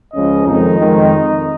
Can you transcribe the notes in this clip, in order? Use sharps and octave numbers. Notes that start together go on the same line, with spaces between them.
C#2 C#3 F3 C#4 D#5
F2 D#3 G#3 D#4
F2 D#3 G#3